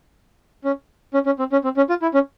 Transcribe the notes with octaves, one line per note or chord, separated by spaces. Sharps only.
C#4
C#4
C#4
C4
C#4
C4
C#4
F4
E4
C#4